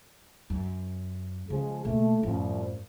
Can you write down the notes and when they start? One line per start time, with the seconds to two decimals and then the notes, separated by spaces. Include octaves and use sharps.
0.50 F#2
1.50 C#3 F3 G#3 G#4
1.85 B2 A3 A#3
2.23 C2 F#2 A2 F3